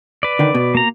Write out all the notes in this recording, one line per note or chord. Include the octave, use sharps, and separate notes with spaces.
B4 D5
D3 D#3
B2
A#3 A#5